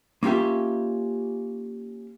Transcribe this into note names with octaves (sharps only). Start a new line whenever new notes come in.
A#3 C#4 F4 G4 E5